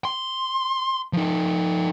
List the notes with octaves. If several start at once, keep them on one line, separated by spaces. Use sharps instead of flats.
C6
F3 D#4